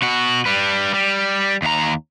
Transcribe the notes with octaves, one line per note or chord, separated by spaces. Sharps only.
B2 F#4
G3 B4
G3
D#2 A#5